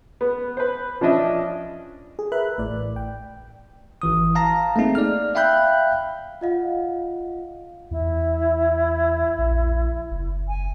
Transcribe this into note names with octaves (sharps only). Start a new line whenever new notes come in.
B3
B4 C5
F3 C#4 D4 D#5 E5
G#4
A#4 B4 E5 B5 F#6
A1 A2 D5
G5
G#1 E3 D#6
F5 A5 A#5 A#6
A3 A#3 C4 D#4 G#4
D5 F6
E5 F5 G5 B5 F#6 G6
F4 D#5 F5 F#5
E2 E4
A#1
F#1
G#5